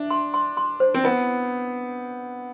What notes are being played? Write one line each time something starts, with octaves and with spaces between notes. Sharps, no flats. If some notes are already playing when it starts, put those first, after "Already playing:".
Already playing: D4 E5
C6
C6
C6
C5
C4
B3 E4